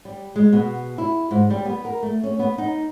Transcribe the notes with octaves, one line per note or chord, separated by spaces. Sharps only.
G3
G#3
B2
E4
G#2
G3
B3
A#4
A3
C#4
B3
D#4